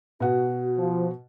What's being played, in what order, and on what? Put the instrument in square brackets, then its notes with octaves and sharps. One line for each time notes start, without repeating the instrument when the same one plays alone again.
[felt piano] B2 F#5 [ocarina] F#4
[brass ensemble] F3